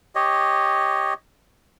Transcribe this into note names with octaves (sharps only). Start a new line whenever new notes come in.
G4 C#5 D#5